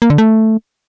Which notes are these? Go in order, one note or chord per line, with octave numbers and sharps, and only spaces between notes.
A#3
D3
A3